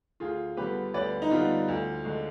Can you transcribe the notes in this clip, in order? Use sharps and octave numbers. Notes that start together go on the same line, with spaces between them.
D2 F4 G#4
D3 G3 B3 G4 B4
D2 B4 D5
D#4
D3 G3 B3 F4
D2
D3 G#3